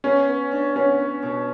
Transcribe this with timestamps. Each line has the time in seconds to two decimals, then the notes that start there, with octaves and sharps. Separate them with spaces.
0.04 B3 C#4
0.28 B3
0.51 D4
0.76 B3 C#4
0.99 B3
1.23 B2